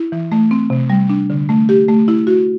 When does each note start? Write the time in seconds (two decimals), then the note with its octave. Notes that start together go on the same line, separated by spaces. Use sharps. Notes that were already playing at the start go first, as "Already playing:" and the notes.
Already playing: E4
0.12 E3
0.32 A3
0.51 C4
0.70 C3
0.90 G3
1.09 D4
1.30 D3
1.49 A3
1.69 G4
1.88 A3
2.08 E4
2.27 F#4